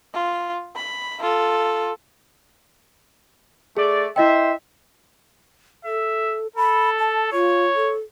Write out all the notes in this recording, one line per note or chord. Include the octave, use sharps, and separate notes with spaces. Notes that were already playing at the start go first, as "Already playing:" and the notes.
F4
B5
F4 A4
A3 G#4 D5
E4 C5 D#5 E5 G5
A4 E5
A4 B5
A5
F4 C#5
A4